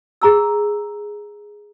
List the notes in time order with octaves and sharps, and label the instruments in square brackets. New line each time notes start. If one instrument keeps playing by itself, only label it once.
[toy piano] G#4 A#5 E6